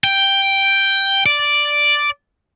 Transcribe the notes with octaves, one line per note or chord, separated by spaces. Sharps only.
G5
D5